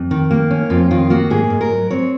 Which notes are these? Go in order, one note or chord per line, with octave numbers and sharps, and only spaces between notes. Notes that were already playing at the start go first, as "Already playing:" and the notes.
Already playing: F2
D#3
A#3
C#4
F2 F4
D#3 F4
A#3 F#4
G#2 G#4
G#2
A#4
F#3
C4 C#5